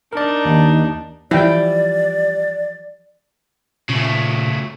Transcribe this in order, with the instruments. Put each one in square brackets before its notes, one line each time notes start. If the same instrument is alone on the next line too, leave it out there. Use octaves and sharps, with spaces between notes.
[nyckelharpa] D4 D#4 [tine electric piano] A#4 D5
[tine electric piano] D#2 [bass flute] D#3
[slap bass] E3 F3 [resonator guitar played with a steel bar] G3 [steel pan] E4 G5 [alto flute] D5
[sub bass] A#2 [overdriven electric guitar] C#3 A3